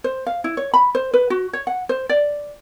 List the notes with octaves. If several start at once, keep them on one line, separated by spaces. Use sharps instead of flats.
C5
F5
E4
C#5
B5
C5
B4
F#4
C#5
F#5
C5
D5